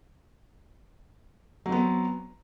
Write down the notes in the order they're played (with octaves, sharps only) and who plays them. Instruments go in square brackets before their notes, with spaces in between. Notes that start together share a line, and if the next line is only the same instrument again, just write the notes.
[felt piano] F#3
C4
B3